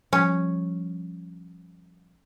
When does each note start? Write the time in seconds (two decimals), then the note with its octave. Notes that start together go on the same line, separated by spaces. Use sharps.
0.13 F3 G3 C#4